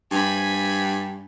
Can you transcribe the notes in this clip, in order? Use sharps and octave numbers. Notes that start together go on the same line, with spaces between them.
G2 G#5 B5